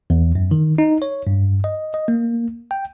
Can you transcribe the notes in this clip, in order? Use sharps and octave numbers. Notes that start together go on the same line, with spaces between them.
E2
F#2
D#3
D#4
C#5
G2
D#5
D#5
A#3
G5